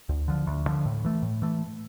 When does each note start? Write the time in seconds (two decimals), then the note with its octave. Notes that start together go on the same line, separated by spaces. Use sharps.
0.09 D2
0.28 D3 F3
0.47 D2
0.66 D3 F3
0.86 A2
1.05 E3 A3
1.22 A2
1.42 E3 A3